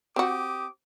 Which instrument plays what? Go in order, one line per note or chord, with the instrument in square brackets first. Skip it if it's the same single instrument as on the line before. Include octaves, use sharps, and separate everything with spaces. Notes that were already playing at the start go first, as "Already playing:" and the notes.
[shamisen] C4 F#4 [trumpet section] G4 D6 D#6